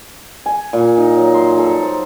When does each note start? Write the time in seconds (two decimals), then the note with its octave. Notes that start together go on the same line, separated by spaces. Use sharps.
0.46 G#5
0.73 A#2
0.98 D#4
1.16 F#3
1.34 C6
1.58 A4
1.83 C5